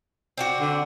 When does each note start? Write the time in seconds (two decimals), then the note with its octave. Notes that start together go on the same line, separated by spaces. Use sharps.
0.37 C4 D4 F#4
0.60 D3